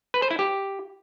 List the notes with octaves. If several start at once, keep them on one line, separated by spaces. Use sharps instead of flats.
B4
C5
E4
G4